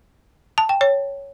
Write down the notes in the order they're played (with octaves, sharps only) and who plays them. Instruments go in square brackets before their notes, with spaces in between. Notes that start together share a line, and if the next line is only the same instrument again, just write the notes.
[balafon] A5
G5
C#5